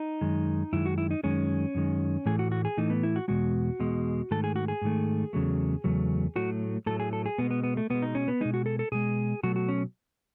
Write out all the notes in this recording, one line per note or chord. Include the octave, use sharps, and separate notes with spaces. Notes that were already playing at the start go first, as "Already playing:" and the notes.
Already playing: D#4
F#2 D#3 G#3
F#2 D#3 G#3 E4
F#4
E4
D#4
F#2 D#3 G#3 C#4
F#2 D#3 G#3
A2 E3 A3 G#4
F#4
F#4
G#4
A2 E3 A3 D#4
B3
E4
F#4
E2 B2 G#3 F#4
E2 B2 G#3
G#2 D#3 A3 A4
G#4
F#4
G#4
G#2 D#3 A3
E2 C#3 F#3 A3
E2 C#3 F#3 A3
A2 F#3 A3 F#4
A2 F#3 A3 A4
G#4
A4
G#4
B2 G#3 B3
B3
B3
A3
B2 G#3 B3
D#4
C#4
B3
B2 G#3 D#4
F#4
A4
A4
B2 G#3 G#4
B2 F#3 A3 F#4
F#4
C#4